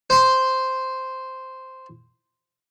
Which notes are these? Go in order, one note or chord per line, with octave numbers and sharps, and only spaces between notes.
C5 C6